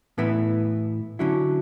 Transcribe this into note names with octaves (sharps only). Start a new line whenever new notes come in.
A2 E3 B3 E4
D3 F#3 C#4 E4